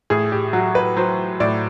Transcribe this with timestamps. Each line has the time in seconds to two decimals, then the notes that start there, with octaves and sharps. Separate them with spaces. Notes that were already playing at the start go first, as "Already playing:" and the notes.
0.10 A2 G#4
0.32 G4
0.53 F#3 F#4
0.75 B4
0.97 F#3 C5
1.40 A2 D5